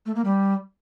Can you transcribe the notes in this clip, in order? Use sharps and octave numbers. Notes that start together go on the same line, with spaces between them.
A3
A#3
G3